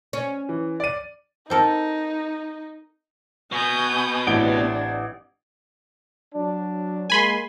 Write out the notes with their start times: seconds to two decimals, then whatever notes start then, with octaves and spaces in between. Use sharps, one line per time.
0.13 C#4
0.49 E3
0.80 D5 D#7
1.50 C4 D#4 A4 A#4
3.52 B2 G#5 D#6 G6
4.27 A1 C3 D4 D7 G7
6.34 F#3 D4
7.10 G#3 A#3 G#5 B5 C6